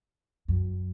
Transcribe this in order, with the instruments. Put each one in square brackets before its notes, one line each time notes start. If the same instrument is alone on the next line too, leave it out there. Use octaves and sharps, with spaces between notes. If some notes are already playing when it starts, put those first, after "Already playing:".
[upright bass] F#2